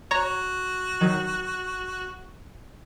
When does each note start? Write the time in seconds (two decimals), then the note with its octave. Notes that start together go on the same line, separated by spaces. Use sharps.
0.11 F#4 C#5 A#5
1.01 D#3 F#3